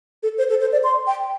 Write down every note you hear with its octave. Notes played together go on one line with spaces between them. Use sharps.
A4
C5
A4
C5
D5
C6
G5